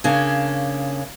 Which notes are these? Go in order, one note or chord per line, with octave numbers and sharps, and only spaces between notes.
C#3 A#3 C#4 D4